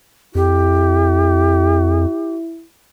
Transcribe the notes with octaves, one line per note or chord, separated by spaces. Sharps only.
F2 E4 G4